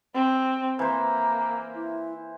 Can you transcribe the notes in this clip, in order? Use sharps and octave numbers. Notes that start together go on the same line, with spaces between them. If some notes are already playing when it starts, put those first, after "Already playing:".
C4
E3 A#3 C5 A#5
E4